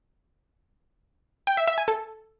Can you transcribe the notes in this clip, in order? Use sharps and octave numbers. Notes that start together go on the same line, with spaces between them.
G5
E5
E5
G#5
A4